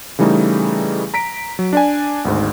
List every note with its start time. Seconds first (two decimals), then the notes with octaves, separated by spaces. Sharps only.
0.19 C#3 E3 G3 A3 D#4 G#4
1.14 A#5 B6 D7
1.59 F#3
1.73 D4 D5 G#5
2.25 G#1 D2 G#2